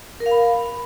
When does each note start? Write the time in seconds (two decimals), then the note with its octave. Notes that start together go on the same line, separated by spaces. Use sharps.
0.20 A#4
0.26 F5
0.31 B5